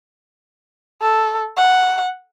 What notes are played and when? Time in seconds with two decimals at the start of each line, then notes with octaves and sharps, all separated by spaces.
1.02 A4
1.57 F#5